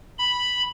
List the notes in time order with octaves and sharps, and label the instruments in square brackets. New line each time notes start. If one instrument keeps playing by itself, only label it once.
[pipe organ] B5